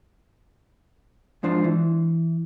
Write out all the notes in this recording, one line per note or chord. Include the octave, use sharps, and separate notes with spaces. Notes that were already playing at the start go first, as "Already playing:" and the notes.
G#2 F3 D4 C5
E3